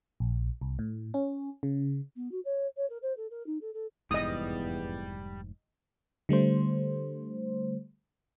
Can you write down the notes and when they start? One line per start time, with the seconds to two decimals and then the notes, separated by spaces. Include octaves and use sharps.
0.20 A#1
0.61 C2
0.79 A2
1.14 C#4
1.63 C#3
2.15 B3
2.32 F#4
2.45 C#5
2.77 C#5
2.90 A#4
3.02 C5
3.17 A4
3.31 A#4
3.47 D#4
3.61 A4
3.74 A4
4.11 F1 E2 G#2 G3 D#5 D#6
6.29 D3 G3 A3 C5